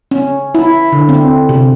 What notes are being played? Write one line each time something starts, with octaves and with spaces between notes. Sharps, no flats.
C#4
E4
D3
C4
C3